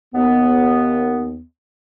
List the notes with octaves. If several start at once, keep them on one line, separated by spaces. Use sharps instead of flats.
D#2 B3